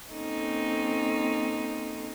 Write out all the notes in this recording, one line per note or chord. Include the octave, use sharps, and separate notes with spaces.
A#3 C4 C#4 D#4 A4